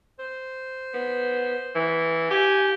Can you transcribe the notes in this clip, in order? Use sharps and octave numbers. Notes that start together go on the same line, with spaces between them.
C5
B3
E3
G4 G#5